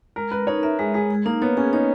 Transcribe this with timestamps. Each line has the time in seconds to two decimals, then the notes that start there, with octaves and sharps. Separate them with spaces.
0.16 G#3 A#4
0.31 A#4 B4
0.47 D#4 C#5
0.63 A#4 E5
0.79 G#3 G#4
0.94 G#3 G#4
1.10 G#4
1.26 A#3 D#4
1.42 B3 C#5
1.57 C#4 G#4
1.73 D#4 C#5